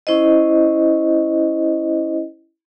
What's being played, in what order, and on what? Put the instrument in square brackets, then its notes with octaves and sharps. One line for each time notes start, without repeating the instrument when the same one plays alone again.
[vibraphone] C#4 E4 C5 D#5